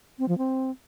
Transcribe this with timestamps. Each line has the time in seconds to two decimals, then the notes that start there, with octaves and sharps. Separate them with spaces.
0.19 C4
0.28 F3
0.38 C4